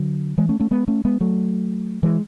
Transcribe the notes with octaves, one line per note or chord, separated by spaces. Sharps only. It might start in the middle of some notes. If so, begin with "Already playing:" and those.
Already playing: D3 F#3
E3 G#3
A3 C#4
A3 C#4
G#3 B3
A3 C#4
G#3 B3
F#3 A3
E3 G#3